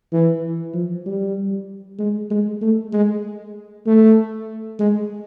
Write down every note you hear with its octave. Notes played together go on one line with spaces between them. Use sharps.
E3
F3
G3
G#3
G#3
A3
G#3
A3
G#3